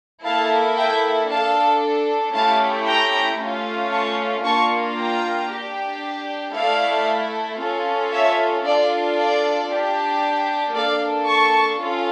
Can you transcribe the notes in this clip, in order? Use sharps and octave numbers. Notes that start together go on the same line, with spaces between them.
A#3 E4 A4 F5 A5
E5 G5
D4 A4 F5 A5
A3 C#4 E4 G4 F5 A5
G5 A#5
A3 C#4 F4
A5 C#6
A#3 D4 F4 A5 C#6
G5 A#5
D4 G4
A3 E4 A4 D5 F5
C#4 F4 A4
C#5 E5
D4 F4 A4 D5
D5
D4 G4
A#3 D4 A4 D5 F5
A5 C#6
C#4 F4 A4